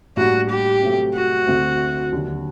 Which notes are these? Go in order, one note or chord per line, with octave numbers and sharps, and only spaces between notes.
A2 G3 A#3 D4 F#4
G4
C3 F#3 A3
F#4
D2 D3 A3 C4
D#2 D3 F#3